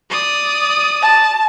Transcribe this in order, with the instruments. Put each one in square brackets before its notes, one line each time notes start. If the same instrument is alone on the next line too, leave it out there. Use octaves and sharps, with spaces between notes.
[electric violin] D5 D#6
[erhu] A5